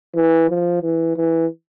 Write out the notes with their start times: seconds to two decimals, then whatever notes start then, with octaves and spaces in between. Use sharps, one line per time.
0.15 E3
0.49 F3
0.82 E3
1.16 E3